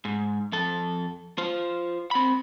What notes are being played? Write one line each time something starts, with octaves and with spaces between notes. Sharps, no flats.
G#2
F2 A4
F4 C5
C4 B5